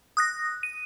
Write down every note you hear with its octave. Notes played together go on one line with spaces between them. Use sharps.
D#6 F#6 A#6
D#7